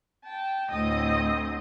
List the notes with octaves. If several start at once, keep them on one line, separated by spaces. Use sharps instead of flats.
G5 A5
D2 A2 A3 C4 D#5 D#6